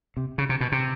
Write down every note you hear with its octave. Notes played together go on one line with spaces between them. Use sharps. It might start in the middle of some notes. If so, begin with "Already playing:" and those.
C3
C#3
C3
B2
C3